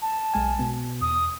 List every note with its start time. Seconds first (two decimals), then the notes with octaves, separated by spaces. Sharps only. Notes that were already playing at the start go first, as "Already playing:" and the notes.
0.02 A5
0.34 B1 G#3 G#5
0.59 B2 B3
1.02 E2 D#6